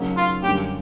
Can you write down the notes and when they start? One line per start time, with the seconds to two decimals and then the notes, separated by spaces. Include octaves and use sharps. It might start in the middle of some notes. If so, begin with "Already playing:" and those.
Already playing: C#3 F#3 A#3 D#4 G#4
0.17 F4
0.43 F#2 D3 G3 A#3 G4